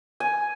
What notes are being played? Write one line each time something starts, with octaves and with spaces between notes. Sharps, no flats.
G#5